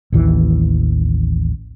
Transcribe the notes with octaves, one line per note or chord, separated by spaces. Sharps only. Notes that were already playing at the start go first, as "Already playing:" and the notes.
A1 D#2 E3